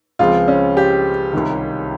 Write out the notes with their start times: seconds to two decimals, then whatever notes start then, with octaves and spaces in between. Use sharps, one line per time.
0.19 C#2 C#3 F3 G#3 C4 F4
0.48 C#4
0.77 G4
1.33 C2 C3 D#3